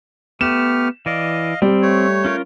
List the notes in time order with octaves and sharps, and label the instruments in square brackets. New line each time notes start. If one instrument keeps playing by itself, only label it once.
[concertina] A3 G4 F6 [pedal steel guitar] B3 [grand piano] E7
[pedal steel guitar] E3 D5 [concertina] D#5 F5
[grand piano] G3 [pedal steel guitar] C4
[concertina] A3 C#5
[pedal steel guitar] C#4 F4 A#4